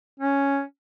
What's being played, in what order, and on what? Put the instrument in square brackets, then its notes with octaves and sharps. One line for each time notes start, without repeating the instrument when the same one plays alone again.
[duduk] C#4